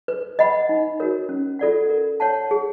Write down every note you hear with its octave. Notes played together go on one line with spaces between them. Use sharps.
B4
D#5 F#5 B5
D#4
F#4 A#4 C#5
C#4
F4 A4 D5 F#5
A#4
C#5 F#5 A5
G#4